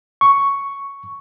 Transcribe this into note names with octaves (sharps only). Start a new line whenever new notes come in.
C#6